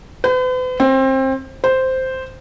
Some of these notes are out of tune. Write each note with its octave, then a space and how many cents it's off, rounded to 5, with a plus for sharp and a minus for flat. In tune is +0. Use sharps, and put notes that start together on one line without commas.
B4 +45
C4 +25
C5 -5